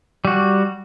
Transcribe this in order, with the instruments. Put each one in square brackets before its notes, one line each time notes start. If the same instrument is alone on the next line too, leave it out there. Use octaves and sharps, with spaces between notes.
[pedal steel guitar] G3 F#4